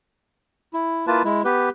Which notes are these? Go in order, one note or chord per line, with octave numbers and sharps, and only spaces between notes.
E4
A#3 E4 F4 B4 A5
G#3 E4
B3 G4 B4